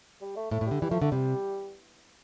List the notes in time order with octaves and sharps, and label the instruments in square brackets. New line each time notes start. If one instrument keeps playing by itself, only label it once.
[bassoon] G3
A3
[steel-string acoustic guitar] A2 [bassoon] A3
[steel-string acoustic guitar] A2
[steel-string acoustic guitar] D3 [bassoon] G3
[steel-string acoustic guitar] E3 [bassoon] G3
[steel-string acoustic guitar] F3 [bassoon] A3
[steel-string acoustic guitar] D3 [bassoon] A3
[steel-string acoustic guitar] C3 [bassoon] G3